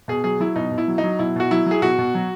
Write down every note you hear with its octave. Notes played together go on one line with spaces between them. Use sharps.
B2 G#4
F#3 G#4
F#3 E4
B2 D#4
B2
E4
F#3
D#4
F#3
B2 E4
B2 F#4
F#3 E4
F#3 G#4
B2 F#4
B2
F#3